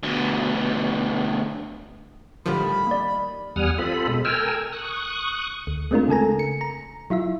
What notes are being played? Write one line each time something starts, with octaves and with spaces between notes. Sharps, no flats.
D2 B2
A2 D3 D#3 F3 G3 B5
A#3 D5
E2 G3 F#5 G#5 D#6 F6
C4 F4 A4 B5
B2 G#3
A4 A#4 G5 G#5 E6 F6
C#6 D#6 F#6
D2
G#3 A3 C4 D4 F4 A#4
C#3 G#3 A4 G#5 A#5
C#7
A#5
F#3 E4 F4 E5